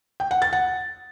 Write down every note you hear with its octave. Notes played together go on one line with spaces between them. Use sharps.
G5
F#5
A6
F#5